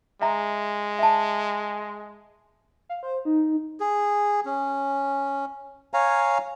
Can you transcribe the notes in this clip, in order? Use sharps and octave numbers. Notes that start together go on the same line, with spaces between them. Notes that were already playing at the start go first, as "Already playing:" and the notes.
G#3 E5 A#5
E5 A5
F5
C5
D#4
G#4
C#4
C#5 F5 G#5 A#5